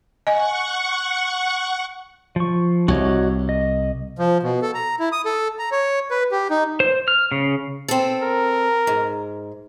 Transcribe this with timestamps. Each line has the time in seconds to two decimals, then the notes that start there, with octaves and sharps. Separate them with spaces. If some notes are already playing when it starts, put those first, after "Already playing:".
0.27 D#5 F#5 G#5 C#6
2.36 F3 C#6
2.88 C2 F#4 C#5 D#5
3.49 D#5
4.19 F3
4.43 B2
4.62 A4
4.75 A#5
5.00 E4
5.12 D#6
5.25 A4
5.59 A#5
5.72 C#5
6.11 B4
6.32 G4
6.50 D#4
6.80 C5
7.08 F6
7.32 C#3
7.88 C4 A4
8.22 A#4
8.87 G#2